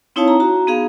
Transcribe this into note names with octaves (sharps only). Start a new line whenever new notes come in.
C4 D#4 E4 C#5 F5 A5
A#5
F#4 A#5
B3 D#4 G#4 F5